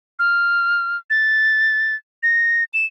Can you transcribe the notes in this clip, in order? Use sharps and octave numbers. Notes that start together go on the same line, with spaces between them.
F6
A6
A#6
E7